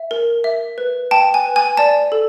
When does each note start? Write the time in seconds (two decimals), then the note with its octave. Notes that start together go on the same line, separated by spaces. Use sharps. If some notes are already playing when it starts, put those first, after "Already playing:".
Already playing: E5
0.11 A#4
0.44 E5
0.78 B4
1.11 G5 A5
1.34 G#5
1.45 B4
1.56 G#5
1.77 D5 A5
2.12 A4